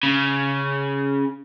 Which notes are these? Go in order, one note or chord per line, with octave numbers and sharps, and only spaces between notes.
C#3